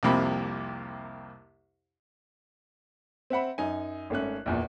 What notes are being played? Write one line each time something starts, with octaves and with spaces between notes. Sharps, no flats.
C2 F2 C3 A#3 G4 B5
C4 E5 F#5 B5
F#2 D#4 G#5
G#1 A3 C#4 F#6
A#1 E2 A#2